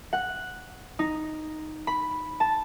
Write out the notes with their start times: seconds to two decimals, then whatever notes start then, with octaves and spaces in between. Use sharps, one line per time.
0.13 F#5
0.99 D#4
1.87 B5
2.40 A5